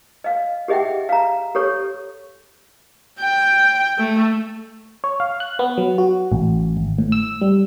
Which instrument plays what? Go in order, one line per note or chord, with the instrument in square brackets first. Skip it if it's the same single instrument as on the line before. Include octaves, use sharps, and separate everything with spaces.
[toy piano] D#5 F5
G4 G#4 D#5 E5 F#5 G5
F5 A#5
G4 A4 C#5 C#6
[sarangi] G5
A3
[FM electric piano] C#5
F5
F#6
B3
F#3
F#4
A1
G#1
A2
E6
G3